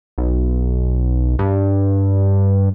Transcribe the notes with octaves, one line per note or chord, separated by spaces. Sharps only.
B1
G2